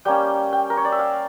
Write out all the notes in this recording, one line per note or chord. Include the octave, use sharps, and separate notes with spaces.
G3 A#3 C#4 G5
G5
A#4
C#5
D5
E5
F5